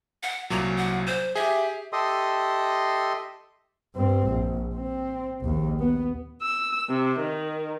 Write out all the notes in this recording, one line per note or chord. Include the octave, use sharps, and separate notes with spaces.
F#5
C2 A#2 F#3 A#5
F#5
C5
G4 G#4 E5
G4 A4 D#5 E5 C6 D#6
G2 C4
A#1
C4
A#1 D#2
B3
E6
C3
D#3